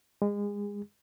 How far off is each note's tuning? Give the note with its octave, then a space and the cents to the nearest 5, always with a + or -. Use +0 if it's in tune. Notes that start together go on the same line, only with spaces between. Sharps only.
G#3 -25 G#4 -30